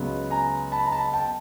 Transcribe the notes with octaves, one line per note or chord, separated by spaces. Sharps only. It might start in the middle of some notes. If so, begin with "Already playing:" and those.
Already playing: C#2 C#3 F#3 B3
G#5 A#5
A5 B5
A#5
A5 B5
G5 A5